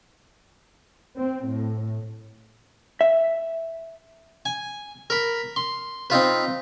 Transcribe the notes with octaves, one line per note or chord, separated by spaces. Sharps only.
C4
A2
E5
G#5
A#4 B5
C6
C4 D#4 F4 B4